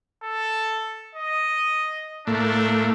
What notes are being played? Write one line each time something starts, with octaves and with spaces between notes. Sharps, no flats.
A4
D#5
A2 A3 A#3 D4